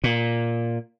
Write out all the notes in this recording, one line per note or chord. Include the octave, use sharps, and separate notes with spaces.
A#2